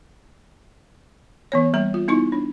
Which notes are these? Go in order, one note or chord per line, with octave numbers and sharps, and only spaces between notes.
E3 B3 C#5
G3 A#3 A#5
F4
B3 D#4 E4 C#6
D4